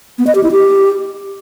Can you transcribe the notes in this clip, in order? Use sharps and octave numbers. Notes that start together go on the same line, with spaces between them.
B3
D#5
G4
E4
G4